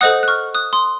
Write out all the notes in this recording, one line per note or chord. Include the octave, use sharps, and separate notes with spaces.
A4 C5 D#5 F#5 D#6 F#6
F#6
C#6 F6
D#6 F#6
C6 D#6